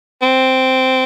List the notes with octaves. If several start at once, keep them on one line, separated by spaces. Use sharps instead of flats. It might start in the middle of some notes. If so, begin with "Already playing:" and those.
C4